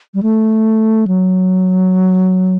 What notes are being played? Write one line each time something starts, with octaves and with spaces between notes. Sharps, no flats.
G3
A3
F#3